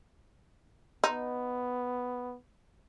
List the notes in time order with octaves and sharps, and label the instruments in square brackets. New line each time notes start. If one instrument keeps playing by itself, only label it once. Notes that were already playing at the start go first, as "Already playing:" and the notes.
[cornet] B3 [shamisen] D#4